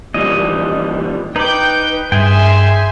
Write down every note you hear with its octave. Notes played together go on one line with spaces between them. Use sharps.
A#2 E3 G3 D#5
D#4 B4 G5 D6 G6
G2 G#4 E5 G5 G#5 C6